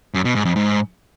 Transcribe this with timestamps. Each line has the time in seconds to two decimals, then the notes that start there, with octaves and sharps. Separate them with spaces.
0.14 F#2
0.25 B2
0.35 G#2
0.45 F2
0.56 G#2